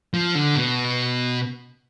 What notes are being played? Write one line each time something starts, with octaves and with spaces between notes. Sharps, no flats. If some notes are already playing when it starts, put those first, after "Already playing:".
F3
D3
B2